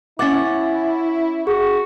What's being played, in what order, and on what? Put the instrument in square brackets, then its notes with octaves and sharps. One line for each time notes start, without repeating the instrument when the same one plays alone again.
[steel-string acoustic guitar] C#4 F#5 [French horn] E4 [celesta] D6 A6
[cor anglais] F#4 [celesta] G#4